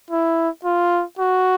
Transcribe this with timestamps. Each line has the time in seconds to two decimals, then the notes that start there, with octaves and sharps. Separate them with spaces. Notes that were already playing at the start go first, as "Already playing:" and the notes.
0.11 E4
0.65 F4
1.19 F#4